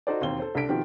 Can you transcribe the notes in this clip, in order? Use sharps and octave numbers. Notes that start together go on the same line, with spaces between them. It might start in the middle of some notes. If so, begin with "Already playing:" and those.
D#4 F#4 A4 C5 D5
E1 D#2 C4 G7
A4 C5
C2 D4 A4 B6 D7
B2 D#3 F3 C4 G4